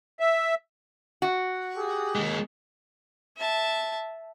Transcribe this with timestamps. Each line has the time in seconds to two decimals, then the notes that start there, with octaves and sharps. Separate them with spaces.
0.20 E5
1.22 F#4
1.76 G4 G#4
2.15 D#2 G#3
3.37 E5 A5